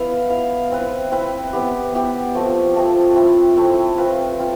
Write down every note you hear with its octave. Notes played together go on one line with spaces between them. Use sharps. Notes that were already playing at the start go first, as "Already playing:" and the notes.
Already playing: B3 E4 B4 F5
E4 B4 F5
C4 E4 B4
C4 E4 B4
B3 E4 G4
B3 E4 G4
F3 A3 C4
F3 A3 C4
A3 C4 E4
A3 C4 E4
C4 F4 B4
C4 F4